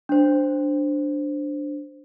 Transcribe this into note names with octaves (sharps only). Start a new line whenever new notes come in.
D4 C5